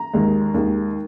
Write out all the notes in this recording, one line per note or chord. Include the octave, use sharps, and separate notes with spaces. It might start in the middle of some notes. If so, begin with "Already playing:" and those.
Already playing: A#5
D#2 D#3 G#3
D#2 D#3 G#3